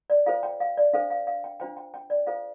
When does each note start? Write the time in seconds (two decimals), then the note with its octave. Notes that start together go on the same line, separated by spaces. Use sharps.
0.10 D5
0.26 F4 A4 C5 F5
0.43 G5
0.60 F5
0.77 D5
0.93 D4 A4 C5 F5
1.10 F5
1.27 F5
1.44 G5
1.60 D4 F4 C5 G5
1.77 G5
1.94 G5
2.10 D5
2.27 F4 A4 C5 F5